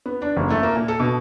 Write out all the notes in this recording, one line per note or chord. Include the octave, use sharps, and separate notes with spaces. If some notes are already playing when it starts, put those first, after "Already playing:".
B3
D4
F#1
A3
A#3
A#2
A4
B2